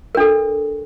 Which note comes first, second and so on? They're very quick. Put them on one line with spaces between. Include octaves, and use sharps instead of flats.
A#4 D4 A4